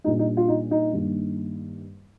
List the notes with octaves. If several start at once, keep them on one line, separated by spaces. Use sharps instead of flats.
A#2 G3 D4 D#4
D#4
F4
D#4
D#4
G2 D#3 A#3